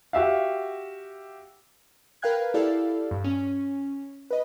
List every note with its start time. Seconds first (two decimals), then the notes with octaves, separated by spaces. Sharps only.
0.13 F#4 G4 E5 F5
2.22 A#4 B4 F5 G5 F#6 G#6
2.54 E4 G4 A4 D5 F5
3.11 G2
3.24 C#4
4.31 B4 D#5